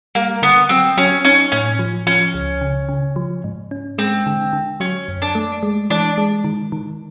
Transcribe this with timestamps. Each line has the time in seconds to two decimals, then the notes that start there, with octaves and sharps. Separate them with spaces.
0.15 G3 A#3
0.42 D3 B3
0.69 F#3 C4
0.97 F#3 C#4
1.25 C#4 D#4
1.52 A2 C#4
1.79 F3
2.07 F3 C#4
2.34 C#2
2.61 C#3
2.89 C#3
3.16 F3
3.44 G#2
3.71 C#4
3.98 G#3 C4
4.26 D3
4.53 D3
4.80 F#3 C#4
5.08 F#2
5.22 D4
5.35 A3
5.63 G#3
5.90 E3 D4
6.18 G#3
6.44 D#3
6.72 D#3